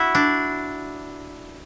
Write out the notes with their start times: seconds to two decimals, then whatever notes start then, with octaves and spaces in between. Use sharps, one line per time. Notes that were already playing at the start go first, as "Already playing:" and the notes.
Already playing: E4 F#4
0.15 D4